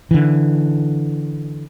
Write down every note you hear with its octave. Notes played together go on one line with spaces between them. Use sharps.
D3 E3